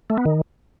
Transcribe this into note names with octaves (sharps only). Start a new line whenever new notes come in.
A3
B3
D#3